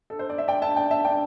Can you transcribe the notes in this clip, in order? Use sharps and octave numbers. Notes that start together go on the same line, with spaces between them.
A4
C5
D5
E5
D5 G5
E5 A5
D5 G5
E5 A5
D5 G5